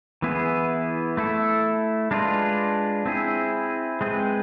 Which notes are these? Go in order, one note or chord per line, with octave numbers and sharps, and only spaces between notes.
E3 B3 E4 G#4
A3 E4 A4
G#3 D4 F4 B4
C4 E4 G#4
G#3 C4 G#4 B4